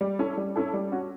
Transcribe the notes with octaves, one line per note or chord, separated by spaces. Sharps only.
G3
C#4 E4 A4
G3
C#4 E4 A4
G3
C#4 F#4